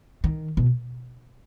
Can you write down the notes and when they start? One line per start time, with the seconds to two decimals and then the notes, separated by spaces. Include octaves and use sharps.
0.24 D#3
0.57 B2